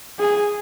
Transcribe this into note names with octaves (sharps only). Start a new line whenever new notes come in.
G#4